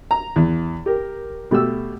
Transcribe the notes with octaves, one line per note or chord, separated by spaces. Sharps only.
A#5
E2
G4 A#4
B2 A3 G4 E6